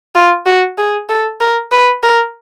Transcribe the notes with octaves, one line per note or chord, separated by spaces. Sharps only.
F4
F#4
G#4
A4
A#4
B4
A#4